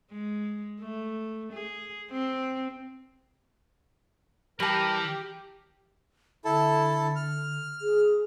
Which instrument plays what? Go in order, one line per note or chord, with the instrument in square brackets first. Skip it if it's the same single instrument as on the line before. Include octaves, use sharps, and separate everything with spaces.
[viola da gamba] G#3
A3
G#4
C4
[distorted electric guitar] E3 [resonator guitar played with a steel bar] G3 A5 [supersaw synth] G4 [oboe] A#4
[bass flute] D3 [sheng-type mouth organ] E4 A4 A5
[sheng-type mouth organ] F6
[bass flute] G#4